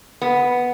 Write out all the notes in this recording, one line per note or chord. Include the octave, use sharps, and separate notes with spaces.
B3